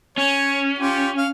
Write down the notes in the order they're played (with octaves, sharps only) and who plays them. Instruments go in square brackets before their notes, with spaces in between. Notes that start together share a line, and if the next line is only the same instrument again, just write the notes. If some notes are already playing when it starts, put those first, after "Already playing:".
[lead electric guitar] C#4 [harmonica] C#5
[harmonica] F4 G4
F5